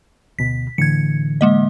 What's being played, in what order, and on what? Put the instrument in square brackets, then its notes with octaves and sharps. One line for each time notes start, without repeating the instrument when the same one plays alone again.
[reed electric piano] D2 B2 [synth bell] B6
[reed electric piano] A2 D3 E3 [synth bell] G#6 C#7
[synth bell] G#3 A#3 D#5